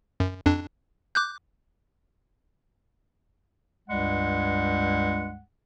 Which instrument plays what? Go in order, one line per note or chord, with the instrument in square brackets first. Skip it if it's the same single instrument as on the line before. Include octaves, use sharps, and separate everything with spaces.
[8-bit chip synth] F#2
F2 D4
D6 F#6 G6
[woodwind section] C#2 G2 G3 G#3 F#5